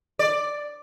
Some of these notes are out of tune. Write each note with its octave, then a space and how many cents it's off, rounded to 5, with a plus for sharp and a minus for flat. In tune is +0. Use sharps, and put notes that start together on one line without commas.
D5 +5